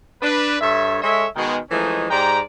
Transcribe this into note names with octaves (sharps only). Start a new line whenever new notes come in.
D4 B4
G2 A4 C#5 E5
G#3 A4 C#5 E5
B2 D#3 G#3
E3 F3 G#3 A3 C#4 D#4
G#2 G4 D5 G5 A#5